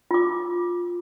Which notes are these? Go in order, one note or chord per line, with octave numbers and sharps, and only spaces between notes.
F4 D6